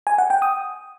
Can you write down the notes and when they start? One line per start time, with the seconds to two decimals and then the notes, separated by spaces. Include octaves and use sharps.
0.07 G#5
0.18 F#5
0.30 G5
0.42 D#6